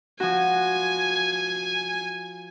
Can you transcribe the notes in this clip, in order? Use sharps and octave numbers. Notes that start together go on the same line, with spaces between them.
F3 F#4 G#5